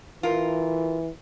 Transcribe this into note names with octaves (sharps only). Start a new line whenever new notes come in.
E3 F4 A#4